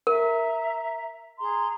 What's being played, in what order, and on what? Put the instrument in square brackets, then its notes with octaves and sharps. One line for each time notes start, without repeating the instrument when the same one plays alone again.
[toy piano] A#4 [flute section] E5 A#5
[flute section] G#4 A#5 C6